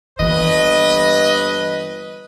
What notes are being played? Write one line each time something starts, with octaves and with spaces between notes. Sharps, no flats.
G1 G2 E3 A#3 B4 D#5